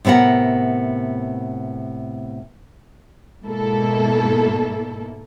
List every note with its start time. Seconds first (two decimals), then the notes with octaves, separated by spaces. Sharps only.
0.05 A2 C3 B3 A#4 F#5
3.43 G#2 B2 A#3 E4 A4